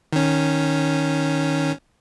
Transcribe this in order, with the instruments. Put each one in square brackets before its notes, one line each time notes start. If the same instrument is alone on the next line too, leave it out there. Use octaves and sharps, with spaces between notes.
[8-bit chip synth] D#3 C#4